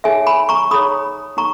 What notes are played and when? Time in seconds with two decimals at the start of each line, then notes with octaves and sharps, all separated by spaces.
0.04 D#4 G#4 C#5 E5 G#5
0.26 G#5 B5
0.49 A#5 C#6
0.71 D#4 G#4 C#5 B5 D#6
1.37 D#4 A#5 C#6